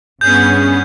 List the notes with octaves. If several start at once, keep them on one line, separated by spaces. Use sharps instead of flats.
G2 B3 C#4 G#4 G6